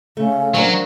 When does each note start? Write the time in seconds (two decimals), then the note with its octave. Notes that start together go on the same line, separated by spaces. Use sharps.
0.17 C#3 A3
0.55 F#3 A#3 D4 C5